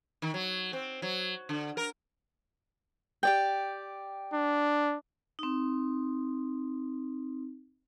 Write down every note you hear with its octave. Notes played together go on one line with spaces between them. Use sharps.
D#3
F#3
C4
F#3
D3
A#4
G4 D5 G5
D4
C4 D#4